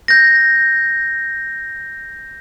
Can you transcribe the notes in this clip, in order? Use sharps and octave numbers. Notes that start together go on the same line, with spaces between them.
G6 A#6